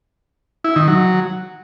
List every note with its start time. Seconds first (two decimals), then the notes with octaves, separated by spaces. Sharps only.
0.64 E4
0.76 D#3
0.88 F#3